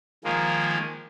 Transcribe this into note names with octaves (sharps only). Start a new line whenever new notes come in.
D#3 F3 G#3 A#3